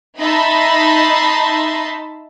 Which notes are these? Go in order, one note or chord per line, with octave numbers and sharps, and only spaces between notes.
D#4 D#5 E5 A5 B5 C6